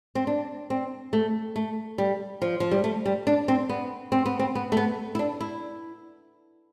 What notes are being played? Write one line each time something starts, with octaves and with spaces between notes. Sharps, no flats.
C4
D4
C4
A3
A3
G3
F3
F3
G3
A3
G3
D4
C4
B3
C4
B3
C4
B3
A3
B3
E4
D4
E4